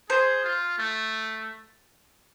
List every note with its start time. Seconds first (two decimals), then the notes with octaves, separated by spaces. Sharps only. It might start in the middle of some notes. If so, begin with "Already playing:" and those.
0.10 G#4 C5
0.44 F4
0.78 A3